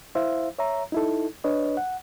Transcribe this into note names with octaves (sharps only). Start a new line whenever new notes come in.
E4 C5 E5 F5
C#5 E5 A#5
D#4 E4 A4
D4 B4 C#5 D#5
F#5